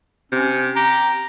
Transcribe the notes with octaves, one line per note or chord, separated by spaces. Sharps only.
C3 C#4
G4 A#5